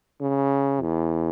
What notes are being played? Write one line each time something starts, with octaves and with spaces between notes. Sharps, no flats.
C#3
E2